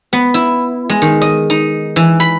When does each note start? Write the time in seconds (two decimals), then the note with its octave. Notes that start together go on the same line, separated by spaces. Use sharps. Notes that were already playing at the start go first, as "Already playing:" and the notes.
0.13 B3
0.34 E4
0.90 G#3
1.02 D#3
1.21 D#5
1.50 D#4
1.96 E3
2.20 B5